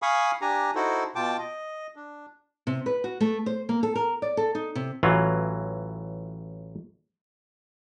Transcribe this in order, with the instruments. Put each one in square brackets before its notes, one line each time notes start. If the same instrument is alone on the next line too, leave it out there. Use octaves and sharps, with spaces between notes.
[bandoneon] F5 G#5 B5 C#6 D#6
D4 G4 G#5 A#5
D#4 E4 F#4 A4 C5
B2 F4 G5 A5 D6
D#5
D4
[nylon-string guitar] C3
B4
F#4
A3
C5
A#3
A4
A#4
D5
A4
D#4
C3
[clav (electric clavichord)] A1 E3 F#3 F4